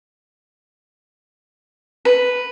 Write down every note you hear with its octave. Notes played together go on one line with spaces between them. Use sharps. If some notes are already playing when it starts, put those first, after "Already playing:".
B4